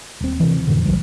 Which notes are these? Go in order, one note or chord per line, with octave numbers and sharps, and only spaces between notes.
D#1 C4
C3 E3
F2 A2 D3 E3
B1 F3 G3